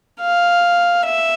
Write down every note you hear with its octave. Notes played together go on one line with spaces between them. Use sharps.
F5
E5